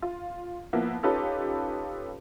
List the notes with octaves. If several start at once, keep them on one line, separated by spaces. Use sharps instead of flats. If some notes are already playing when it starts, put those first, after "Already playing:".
F4
F3 A#3 B3 E4
C#4 D#4 F4 G4 A4 B4